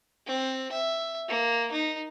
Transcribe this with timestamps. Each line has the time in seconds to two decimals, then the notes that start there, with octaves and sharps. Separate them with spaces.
0.27 C4
0.72 E5
1.29 A#3
1.72 D#4